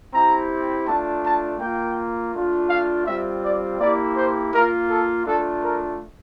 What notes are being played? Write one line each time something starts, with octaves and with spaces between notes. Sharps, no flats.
C4 E4 G4 A#5
A3 D4 F4 A5
A5
A#3 F4 G5
A3 D4 F4
F5
G3 C4 F4 E5
D5
A#3 E4 G4 D5
C5
A#3 F4 A#4
A4
A3 D4 F4 A4
A#4